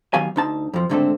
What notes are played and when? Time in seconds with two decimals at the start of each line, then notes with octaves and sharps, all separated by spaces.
0.14 D#3 F#3 B3 G4 F5 G#5
0.36 D2 D#4 A5
0.74 F2 F3
0.89 C#2 G#2 D3 A3 C4 A4